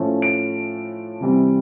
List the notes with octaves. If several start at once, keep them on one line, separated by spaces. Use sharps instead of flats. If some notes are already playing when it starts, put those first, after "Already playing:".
Already playing: A2 F3 A3 C#4
D7
C3 E3 G3 C4